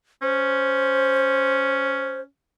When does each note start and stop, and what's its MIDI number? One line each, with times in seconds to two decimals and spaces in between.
0.22 2.26 61
0.22 2.21 72